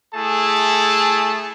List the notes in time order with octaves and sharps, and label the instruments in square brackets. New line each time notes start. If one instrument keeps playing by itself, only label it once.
[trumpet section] A3 E4 G#4 A5